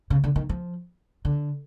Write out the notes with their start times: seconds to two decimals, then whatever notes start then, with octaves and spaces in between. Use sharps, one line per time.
0.10 C#3
0.24 D3
0.36 D#3
0.49 F3
1.25 D3